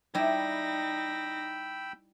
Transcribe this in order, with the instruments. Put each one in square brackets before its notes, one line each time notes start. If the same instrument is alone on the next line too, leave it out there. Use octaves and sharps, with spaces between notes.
[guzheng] G3 E4 [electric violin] D#4 A#6 [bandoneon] G5 B5 E6